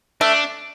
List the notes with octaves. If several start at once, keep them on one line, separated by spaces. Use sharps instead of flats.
A3 D4